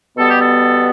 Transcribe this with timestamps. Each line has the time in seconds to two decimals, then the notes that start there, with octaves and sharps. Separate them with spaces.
0.17 B2 G3 B3 A4
0.29 G4
0.40 A4